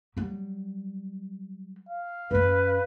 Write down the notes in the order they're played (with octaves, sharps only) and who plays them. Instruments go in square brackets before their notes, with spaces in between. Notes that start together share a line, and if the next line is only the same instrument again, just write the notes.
[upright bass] F#3 G3
[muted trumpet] F5
[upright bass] F#2 C#4 [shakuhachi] B4